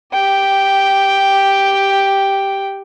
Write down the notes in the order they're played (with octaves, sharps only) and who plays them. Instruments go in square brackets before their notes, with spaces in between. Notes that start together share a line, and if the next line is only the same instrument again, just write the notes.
[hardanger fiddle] G4 G5